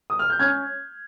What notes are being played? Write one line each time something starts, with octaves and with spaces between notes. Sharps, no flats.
D#6
F6
G6
C#4 F6 G#6